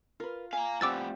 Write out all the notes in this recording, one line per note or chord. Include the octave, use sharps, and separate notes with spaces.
F4 A#4 B4
F5 G#5 A#5
F3 G3 A3 B3 C4 D6 E6 A6